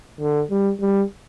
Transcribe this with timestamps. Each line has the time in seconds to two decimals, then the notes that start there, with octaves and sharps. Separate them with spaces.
0.20 D3
0.50 G3
0.81 G3